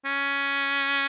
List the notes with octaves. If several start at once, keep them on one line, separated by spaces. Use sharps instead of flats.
C#4